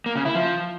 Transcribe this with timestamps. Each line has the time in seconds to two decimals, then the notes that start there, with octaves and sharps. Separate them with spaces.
0.06 A#3
0.16 C#3
0.25 E4
0.35 F3